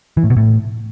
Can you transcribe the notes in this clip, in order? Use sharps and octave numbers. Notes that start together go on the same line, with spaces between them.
E3
A2
B2
A2